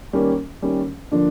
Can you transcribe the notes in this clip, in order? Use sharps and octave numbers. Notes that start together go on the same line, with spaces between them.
D#3 G3 A#3 C#4
D#3 G3 A#3 C#4
D3 F3 A#3 D4